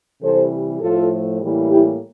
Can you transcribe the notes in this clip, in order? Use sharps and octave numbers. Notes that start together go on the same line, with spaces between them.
C3 E3 G3 A4 C5
A2 F3 A3 F4 A4
A2 E3 G3 A#3
E4 G4